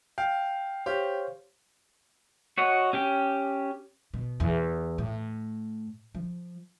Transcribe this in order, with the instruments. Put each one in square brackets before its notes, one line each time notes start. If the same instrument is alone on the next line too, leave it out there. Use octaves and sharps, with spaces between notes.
[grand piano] F5 [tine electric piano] G5
[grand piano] G4 [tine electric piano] C5 C#5 F5
[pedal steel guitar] F#4 C#5 D#5 F#5
C#4 G4 G5
[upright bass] B2
E2
A2
F3